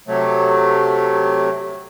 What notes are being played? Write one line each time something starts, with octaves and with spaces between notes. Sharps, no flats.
C3 F#3 A3